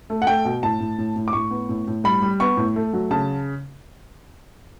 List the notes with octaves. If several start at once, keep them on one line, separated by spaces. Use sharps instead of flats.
A3
F#5
A3 G5
B2
A2 A5
A2
A2
A2
D6
A2 C#6
B3
A2
A2
G3 B5
G3
B3 C#6
A2
A3
F#3
C#3 A5